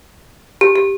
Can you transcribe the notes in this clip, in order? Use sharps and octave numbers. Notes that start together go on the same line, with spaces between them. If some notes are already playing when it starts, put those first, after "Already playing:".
G4
G4